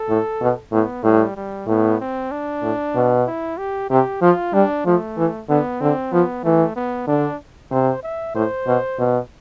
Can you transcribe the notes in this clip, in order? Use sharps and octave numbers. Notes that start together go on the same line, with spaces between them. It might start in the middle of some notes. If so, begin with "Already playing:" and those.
Already playing: A4
A2
B2
A2 B3
A2 G3
G3
A2 B3
C4
D4
A2
B2
E4
G4
C3 G4
F3 F4
G3 D4
F3 A3
E3
D3 B3
D3 C4
F3 B3
E3 A3
B3
D3 D4
C3 C5
E5
A2 C5
B2
B2